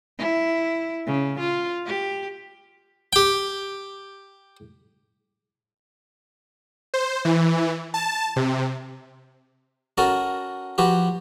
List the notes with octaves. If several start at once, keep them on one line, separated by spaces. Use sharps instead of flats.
E4
C#3
F4
G4
G4 G5
C5
E3
A5
C3
C#4 F#4 A4 A#4
F3 F#4 G4 B4